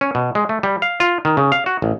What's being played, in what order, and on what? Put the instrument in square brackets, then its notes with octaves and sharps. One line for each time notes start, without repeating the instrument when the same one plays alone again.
[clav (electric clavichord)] C#4
B2
G#3
A3
G3
F5
F4
D#3
C#3
F5
F#4
A1